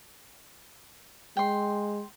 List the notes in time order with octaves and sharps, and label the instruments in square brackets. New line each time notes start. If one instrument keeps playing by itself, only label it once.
[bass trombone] G#3 [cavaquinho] G5 C6